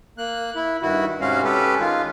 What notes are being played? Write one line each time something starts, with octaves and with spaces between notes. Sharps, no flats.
A#3 F#6
E4
G2 D#3 E4 F#4
G#2 C3 G#3 C#4 F#4 F5
C#4 G4 A4 B4
D#3 G#3 F4